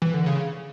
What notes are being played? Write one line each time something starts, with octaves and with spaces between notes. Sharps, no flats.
E3
D3
C#3